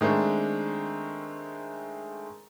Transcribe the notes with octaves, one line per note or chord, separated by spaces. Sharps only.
D#3 G#3 A3 C4 D4